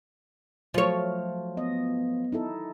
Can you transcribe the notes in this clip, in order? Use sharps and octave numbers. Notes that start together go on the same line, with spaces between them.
F3 F#3 A3 C#5
B3 D#5
D#4 E4 A4